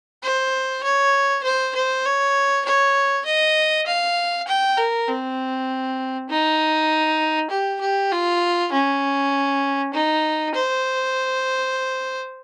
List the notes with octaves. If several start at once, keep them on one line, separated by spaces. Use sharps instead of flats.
C5
C#5
C5
C5
C#5
C#5
D#5
F5
G5
A#4
C4
D#4
G4
G4
F4
C#4
D#4
C5